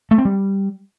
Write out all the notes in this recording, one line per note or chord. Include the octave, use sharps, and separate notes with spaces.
A3
C4
G3